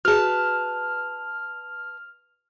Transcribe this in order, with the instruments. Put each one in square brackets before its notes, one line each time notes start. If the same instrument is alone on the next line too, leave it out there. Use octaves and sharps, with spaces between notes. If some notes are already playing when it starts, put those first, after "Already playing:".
[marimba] F#4 G#4 [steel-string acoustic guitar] B4 A5 [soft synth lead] F6